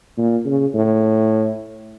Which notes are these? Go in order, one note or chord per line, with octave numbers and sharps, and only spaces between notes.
A#2
C#3
A2